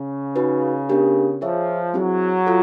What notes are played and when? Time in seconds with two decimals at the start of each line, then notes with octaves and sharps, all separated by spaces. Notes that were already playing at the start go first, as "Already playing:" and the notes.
Already playing: C#3
0.36 D#4 F#4 B4
0.89 B3 D4 G4 A#4
1.41 F3 F4 G#4 C#5 E5
1.94 F#3 C4 E4 G#4
2.47 F4 A4